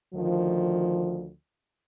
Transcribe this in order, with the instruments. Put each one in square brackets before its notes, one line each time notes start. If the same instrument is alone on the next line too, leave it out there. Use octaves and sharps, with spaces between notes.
[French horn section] D2 D#3 F3